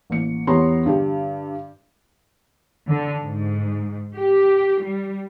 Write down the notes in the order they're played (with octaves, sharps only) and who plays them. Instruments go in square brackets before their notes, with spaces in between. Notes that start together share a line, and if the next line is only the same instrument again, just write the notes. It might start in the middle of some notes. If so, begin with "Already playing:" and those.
[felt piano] A1 A#3 C#7
E2 B3 G4 C#5 A#5 C6
G2 D3 G4
[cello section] D3
G#2
G4
G3